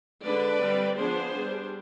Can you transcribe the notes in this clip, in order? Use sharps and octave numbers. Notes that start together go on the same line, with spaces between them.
D3 G#3 D4 B4 D5
G3 C4
F3 B3 D4 G#4 C5
G3 D4